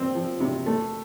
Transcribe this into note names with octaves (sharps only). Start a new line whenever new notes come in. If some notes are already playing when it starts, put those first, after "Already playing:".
Already playing: C4
F3
C3
A3